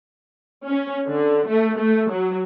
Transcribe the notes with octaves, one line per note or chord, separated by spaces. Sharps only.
C#4
D3
A3
A3
F#3